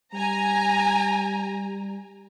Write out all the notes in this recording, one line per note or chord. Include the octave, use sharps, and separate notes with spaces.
G3 G#5 A#5